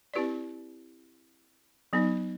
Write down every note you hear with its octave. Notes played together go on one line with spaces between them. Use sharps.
C4 E4 G4 B4 D5
F#3 B3 D#4